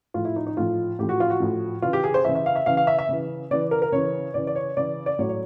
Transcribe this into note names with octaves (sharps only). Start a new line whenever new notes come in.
A2 F3 F4
E4
D#4
D#4
A2 F3 F4
A2 F3 G4
F#4
F4
F#4
A2 F3
C#3 E3 F4
G4
G#4
C5
C#3 E3 E5
E5
F5
E5
C#3 E3 F5
F5
E5
E5
C#3 E3
C#3 E3 D5
A#4
A#4
C#3 E3 C#5
C#3 E3 D5
D5
C#5
C#3 E3 D5
D5
A2 F#3 C#5
C#5